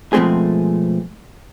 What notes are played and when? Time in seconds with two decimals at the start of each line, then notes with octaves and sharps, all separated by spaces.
0.13 B2 F3 G#3 A3 C4 G#4